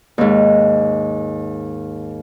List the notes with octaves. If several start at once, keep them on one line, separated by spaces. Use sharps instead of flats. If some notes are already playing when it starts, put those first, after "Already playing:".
D#2 G#2